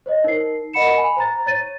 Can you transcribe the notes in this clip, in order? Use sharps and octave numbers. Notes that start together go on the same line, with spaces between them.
C5 C#5 D#5
D#4 A#4 C7
A#4 D#5 F#5 B5 C#7 E7
G#5 B5
C5 A#5 A6
C#5 A6 D#7